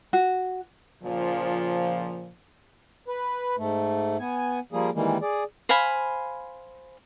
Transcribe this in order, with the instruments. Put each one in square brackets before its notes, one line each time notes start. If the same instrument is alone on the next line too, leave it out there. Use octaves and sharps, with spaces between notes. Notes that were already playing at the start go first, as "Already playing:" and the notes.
[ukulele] F#4
[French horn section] A#2 C#3 F3
[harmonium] B4
G#2 A3
B3 G#5
F3 G3 A#3 G#4
D#3 E3 G3 G#3 A#3
G#4 D5
[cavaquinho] C5 F5 G#5 B5